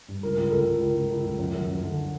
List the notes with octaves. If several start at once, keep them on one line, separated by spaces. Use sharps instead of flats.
G2
C#2 A#4
C#2
A#4
C#2 A4
C#2
C#2 A#4
C#2
C#2
C#2
F#2
F#2
F#2
D3